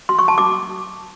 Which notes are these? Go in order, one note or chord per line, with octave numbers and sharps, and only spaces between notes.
C6
C#6
A5
D6